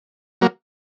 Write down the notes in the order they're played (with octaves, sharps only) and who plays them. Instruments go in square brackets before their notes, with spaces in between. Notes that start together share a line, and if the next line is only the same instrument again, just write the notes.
[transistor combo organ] F#3 A#3